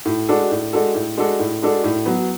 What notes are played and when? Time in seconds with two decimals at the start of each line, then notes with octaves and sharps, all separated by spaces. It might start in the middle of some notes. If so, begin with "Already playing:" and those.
0.05 A2
0.28 G#3 D4 F#4 A4
0.51 A2
0.73 G#3 D4 F#4 A4
0.95 A2
1.17 G#3 D4 F#4 A4
1.39 A2
1.62 G#3 D4 F#4 A4
1.84 A2
2.06 F#3 B3